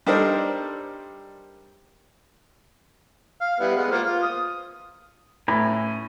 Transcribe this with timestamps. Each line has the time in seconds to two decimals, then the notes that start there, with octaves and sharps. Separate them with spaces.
0.06 G3 D4 D#4 A4 A#4 C5
3.42 F5
3.60 G3 B3 E4
3.76 G#3 B3
3.91 A#3 F4 C5
4.05 F4
4.23 D#6
5.48 A2 B4 G#5 A#5
5.67 C#4